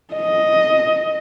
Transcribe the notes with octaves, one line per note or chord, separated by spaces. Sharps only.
D#5